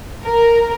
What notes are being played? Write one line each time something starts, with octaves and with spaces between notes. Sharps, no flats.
A#4